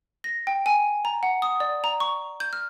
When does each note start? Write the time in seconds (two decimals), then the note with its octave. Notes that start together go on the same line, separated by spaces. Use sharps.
0.24 A#6
0.47 G5
0.66 G#5
1.05 A#5
1.23 F#5
1.42 D#6
1.60 D5
1.84 A#5
2.00 C#6
2.40 G6
2.53 F6